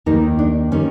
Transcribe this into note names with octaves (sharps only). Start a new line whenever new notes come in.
D#2 D#3 G3 A#3 D#4
D4
D#3 G3 A#3 C#4